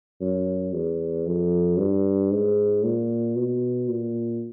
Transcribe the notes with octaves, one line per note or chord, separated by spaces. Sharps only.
F#2
E2
F2
G2
G#2
A#2
B2
A#2